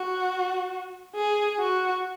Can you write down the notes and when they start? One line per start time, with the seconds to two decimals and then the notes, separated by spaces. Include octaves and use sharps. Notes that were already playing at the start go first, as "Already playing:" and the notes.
Already playing: F#4
1.16 G#4
1.60 F#4